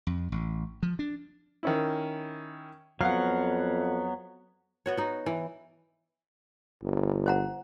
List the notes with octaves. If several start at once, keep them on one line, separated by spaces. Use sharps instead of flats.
F2
A1
F3
D4
D#3 C#4 E4
F2 F#3 B3 F5 F#5
B3 F#4 C#5
D#4 F#4
E3
G1
C5 F#5 A#5